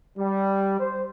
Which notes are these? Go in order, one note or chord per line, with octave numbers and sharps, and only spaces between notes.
G3
C5